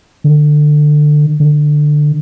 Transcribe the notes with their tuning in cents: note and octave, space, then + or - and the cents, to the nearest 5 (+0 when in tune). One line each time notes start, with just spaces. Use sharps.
D3 +20
D3 +15